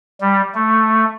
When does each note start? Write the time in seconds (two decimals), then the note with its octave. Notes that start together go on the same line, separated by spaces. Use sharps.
0.21 G3
0.55 A3